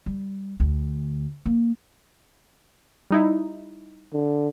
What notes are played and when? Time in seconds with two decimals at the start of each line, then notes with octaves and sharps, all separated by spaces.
0.06 G3
0.60 D2
1.46 A#3
3.11 G3 D#4 E4
4.13 D3